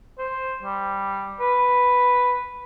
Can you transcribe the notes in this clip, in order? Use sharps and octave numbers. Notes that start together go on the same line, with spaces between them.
C5
G3
B4